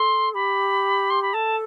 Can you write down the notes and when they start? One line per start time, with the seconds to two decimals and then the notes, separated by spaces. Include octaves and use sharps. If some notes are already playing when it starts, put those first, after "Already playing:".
Already playing: A4 C6
0.34 G4 B5
1.10 C6
1.22 B5
1.34 A4 A5